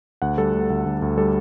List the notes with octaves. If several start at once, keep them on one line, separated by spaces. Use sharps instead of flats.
D2 F#5
G3 A4
D2
D2
D2
D2
G3 A4